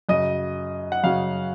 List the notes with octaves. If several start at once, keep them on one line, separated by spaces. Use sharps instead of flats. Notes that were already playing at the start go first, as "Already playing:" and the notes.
F#2 C#3 F#3 D#5
F#5
F#2 C#3 F#3 F5